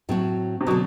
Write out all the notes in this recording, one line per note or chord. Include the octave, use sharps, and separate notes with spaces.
A2 F#3 C4 F#4
C3
B2 D3 F#3 C4